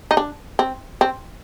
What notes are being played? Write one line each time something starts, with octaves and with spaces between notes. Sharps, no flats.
D#4
D4
C4
C4